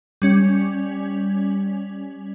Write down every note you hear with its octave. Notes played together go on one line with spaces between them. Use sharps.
G3 C#4